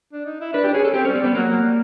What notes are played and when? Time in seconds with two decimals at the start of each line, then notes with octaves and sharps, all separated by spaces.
0.13 D4
0.26 D#4
0.41 E4
0.53 D4 B4
0.64 G4
0.68 D4
0.73 C#4 G#4
0.85 A4
0.94 C4 G4
1.05 C#4
1.07 G3
1.15 C4
1.21 G3 B3
1.35 F#3 A#3
1.48 F#3
1.62 G3